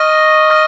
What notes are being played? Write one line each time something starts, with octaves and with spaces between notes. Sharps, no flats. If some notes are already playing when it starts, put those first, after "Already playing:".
Already playing: D#5 C#6 F6 A#6 D#7
C#6 F6 A#6